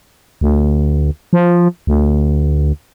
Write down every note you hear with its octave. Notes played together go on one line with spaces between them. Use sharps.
D2
F3
D2